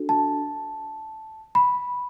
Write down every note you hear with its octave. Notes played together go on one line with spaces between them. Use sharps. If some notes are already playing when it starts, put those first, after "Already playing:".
Already playing: D4 F#4 A4
A5
B5